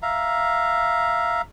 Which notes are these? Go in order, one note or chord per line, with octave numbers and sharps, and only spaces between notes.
E5 F5 A#5